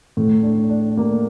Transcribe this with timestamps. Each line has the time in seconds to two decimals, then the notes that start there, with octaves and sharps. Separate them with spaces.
0.17 A2
0.43 D4
0.70 D4
0.97 A#3